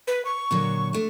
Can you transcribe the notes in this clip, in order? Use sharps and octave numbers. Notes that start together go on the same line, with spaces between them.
B4
C#6
A#2 D3 F#3
A3 D4